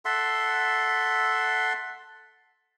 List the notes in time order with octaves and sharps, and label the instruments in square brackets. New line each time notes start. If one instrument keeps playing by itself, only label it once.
[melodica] A4 E5 F#5 C6